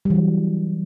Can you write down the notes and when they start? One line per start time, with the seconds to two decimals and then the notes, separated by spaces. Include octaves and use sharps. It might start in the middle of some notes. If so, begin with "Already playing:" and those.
0.05 G3
0.10 E3
0.15 F#3